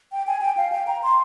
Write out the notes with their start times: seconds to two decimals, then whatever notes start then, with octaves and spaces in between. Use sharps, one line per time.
0.12 G5
0.27 G#5
0.41 G5
0.57 F5
0.72 G5
0.87 A#5
1.03 C6